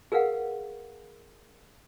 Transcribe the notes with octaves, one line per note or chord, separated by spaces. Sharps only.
G#4 A#4 B4 F5 F#5